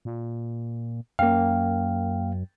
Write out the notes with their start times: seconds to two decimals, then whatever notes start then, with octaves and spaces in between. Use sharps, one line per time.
0.05 A#2
1.19 F#2 A#3 F5 G5